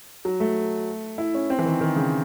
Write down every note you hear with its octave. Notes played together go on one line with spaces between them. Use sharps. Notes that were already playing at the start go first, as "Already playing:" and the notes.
F#3
A3
E4
C#4
C4
E3
D#3
D#3
C#3